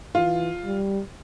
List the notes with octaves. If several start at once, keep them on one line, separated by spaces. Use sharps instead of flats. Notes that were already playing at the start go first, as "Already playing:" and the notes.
E3 F4
G3